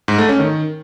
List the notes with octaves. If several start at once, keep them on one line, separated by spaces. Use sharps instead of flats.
G#2
A3
C#4
D#3